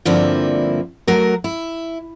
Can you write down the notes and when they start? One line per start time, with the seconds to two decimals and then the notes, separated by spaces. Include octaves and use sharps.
0.05 G2 D3 F3 A#3 C4 E4
1.08 F#3 A3 F#4 A#4
1.44 E4